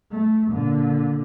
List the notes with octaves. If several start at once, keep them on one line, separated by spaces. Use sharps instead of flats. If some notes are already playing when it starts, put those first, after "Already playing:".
A3
A#2 D3